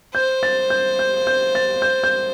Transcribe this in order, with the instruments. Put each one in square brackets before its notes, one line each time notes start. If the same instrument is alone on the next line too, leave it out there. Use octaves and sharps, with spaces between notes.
[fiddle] C5 [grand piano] G6
[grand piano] A6
G6
G6
G6
A6
G6
G6